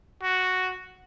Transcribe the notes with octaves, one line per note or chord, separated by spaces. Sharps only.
F#4